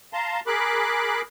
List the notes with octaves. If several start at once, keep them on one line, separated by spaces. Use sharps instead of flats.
F5 A5 A#5 C6
G#4 A#4 B5 D6 F#6